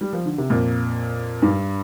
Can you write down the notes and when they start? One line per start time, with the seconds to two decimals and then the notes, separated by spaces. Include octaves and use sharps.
0.01 G3
0.13 F3
0.26 D3
0.38 C3
0.50 F2 A#2
1.42 G2